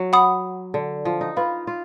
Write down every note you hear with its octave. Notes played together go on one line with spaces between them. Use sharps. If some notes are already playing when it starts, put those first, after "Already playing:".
Already playing: F#3
F#5 B5 D#6
D3
F3
D#4
F4 B4 F5 B5
F4